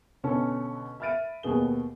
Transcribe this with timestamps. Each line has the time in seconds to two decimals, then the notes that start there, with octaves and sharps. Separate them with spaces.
0.24 B2 D3 C#4 A4
1.00 E5 B5 F6 A6 D7 D#7
1.43 D#2 B2 B3 G#4 A#4 G7